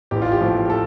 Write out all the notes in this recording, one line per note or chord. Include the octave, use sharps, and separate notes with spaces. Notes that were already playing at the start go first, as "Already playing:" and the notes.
A1 G4
F4
G4
A2 F3
G4
A4